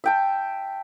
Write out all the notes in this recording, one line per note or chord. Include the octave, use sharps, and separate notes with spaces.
E5 G5 A5